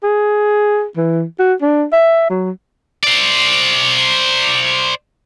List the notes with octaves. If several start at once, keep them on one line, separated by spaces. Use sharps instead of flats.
G#4
E3
F#4
D4
E5
F#3
C5 D5